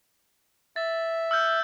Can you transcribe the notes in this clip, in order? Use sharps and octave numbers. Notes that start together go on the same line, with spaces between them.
E5 A6
E6 F6 G6